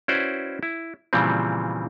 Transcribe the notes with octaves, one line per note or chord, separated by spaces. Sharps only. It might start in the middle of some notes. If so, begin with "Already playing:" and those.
C#4 E4 F#4 B4 C5 D5
E4
A#2 C#3 E3 F3 G3 C4